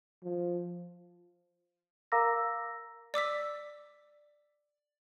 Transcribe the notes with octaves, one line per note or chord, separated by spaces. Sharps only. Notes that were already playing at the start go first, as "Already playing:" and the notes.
F3
A#4 F5 A#5 D6 E6 A#6
D5 D6 E6 B6